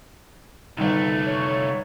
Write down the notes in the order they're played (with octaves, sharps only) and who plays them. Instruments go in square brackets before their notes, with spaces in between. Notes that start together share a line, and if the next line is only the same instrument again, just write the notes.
[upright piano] G1 D#3 [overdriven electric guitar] C2 A3
[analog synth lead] C#5